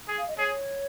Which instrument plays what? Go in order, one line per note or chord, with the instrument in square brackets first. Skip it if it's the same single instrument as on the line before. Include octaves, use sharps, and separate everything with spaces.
[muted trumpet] G#4
[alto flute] F5
D#5
[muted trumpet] G#4 [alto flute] C#5